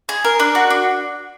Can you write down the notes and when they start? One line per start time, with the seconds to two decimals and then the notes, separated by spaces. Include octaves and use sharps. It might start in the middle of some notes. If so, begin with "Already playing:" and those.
0.09 G#4
0.24 A#4
0.40 D4
0.55 F#4
0.70 D4